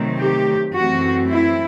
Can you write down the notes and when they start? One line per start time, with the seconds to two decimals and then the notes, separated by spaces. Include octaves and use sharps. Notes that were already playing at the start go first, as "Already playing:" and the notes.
Already playing: C3 D#3 F#3 A3 C4
0.20 G4
0.74 F#2 E3 A3 C4 F#4
1.28 E4